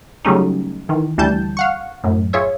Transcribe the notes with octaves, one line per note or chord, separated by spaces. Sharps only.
C#3 F#3 G3 A3 C#4 D#4
D#3 E3
D2 E3 G3 A5 G6
F5 F#5 C#6
F#2 A2
F4 G#4 C#5 E5